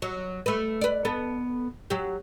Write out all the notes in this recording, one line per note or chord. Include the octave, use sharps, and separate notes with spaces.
F#3
A3 B4
B4 D5
B3 A4
F#3 G4